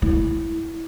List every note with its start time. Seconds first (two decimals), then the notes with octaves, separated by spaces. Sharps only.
0.02 E4